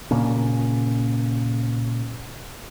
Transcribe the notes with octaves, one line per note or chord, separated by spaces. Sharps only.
A#2 C#3 A#3 C#4